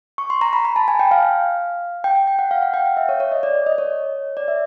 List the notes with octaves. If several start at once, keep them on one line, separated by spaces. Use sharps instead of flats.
C#6
C6
A#5
B5
B5
A5
G#5
G5
F5
G5
G5
G5
F#5
F5
F#5
G5
F5
E5
C#5
C#5
D#5
D5
D5
D#5
C#5
D5
E5